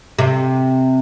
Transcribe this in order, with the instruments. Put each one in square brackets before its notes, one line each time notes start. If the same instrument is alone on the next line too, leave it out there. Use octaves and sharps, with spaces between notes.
[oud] C3